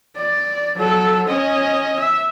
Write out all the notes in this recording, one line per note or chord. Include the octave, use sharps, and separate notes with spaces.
D5
F#3 A4
C#4 D#5
E5